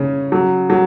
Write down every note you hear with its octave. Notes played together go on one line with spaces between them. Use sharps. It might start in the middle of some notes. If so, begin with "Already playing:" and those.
Already playing: C#3 C#4
F#3
F#3